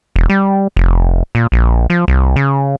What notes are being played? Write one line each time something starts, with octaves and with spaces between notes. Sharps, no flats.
E1
G3
F1
A#2
A#1
F3
C2
C#3